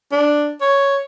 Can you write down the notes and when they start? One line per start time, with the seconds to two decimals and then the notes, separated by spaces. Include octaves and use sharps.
0.12 D4
0.61 C#5